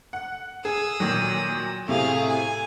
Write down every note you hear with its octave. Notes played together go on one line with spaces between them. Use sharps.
F#5
G#4 D#6 E6
A#2 D#3 F#3
A2 C3 G#4 F5
G#5